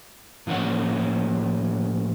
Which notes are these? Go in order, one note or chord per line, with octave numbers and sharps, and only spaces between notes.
A2 F3 A#3 C#4 C#5 F#5